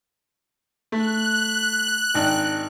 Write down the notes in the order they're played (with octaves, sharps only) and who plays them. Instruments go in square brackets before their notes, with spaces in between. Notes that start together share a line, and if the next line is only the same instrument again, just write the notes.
[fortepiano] A3 [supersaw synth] F#6
[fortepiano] G#1 D4 G5